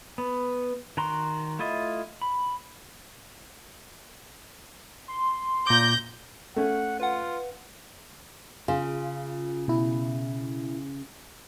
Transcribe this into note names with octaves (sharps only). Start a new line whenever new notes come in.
B3
D#3 F#4 A#5 C6
A3 E4 F4 D#5
B5
C6
A#2 D6 G6 A#6
A3 C#4 F#5
F4 B4 F#5
C#3 F4
B2 E4